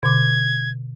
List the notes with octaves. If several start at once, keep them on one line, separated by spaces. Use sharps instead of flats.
B2 D3 D6 G#6